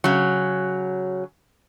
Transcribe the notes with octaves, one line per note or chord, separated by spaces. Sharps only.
C#3 F#3